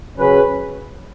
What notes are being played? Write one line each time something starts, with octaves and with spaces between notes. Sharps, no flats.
C#3 F#3 C#4 G#4 B4